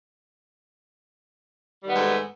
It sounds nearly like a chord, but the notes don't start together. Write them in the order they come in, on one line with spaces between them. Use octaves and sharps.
G3 D#3 B3 G#2 A3